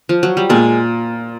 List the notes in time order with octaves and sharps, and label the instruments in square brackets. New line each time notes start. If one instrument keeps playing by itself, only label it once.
[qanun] F3
F#3
G3
[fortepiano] A#2 [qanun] G#3